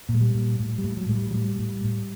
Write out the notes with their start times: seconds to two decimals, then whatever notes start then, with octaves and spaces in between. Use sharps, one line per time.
0.09 A#2
0.14 G#3
0.21 G3
0.35 A#2
0.60 A2
0.78 G3
0.84 A2
0.97 F#3
1.09 A2 G#3
1.15 G3
1.31 F#3
1.34 A2 G3
1.59 A2
1.84 A2